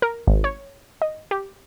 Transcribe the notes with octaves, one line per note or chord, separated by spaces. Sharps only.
A#4
G#1
C#5
D#5
G4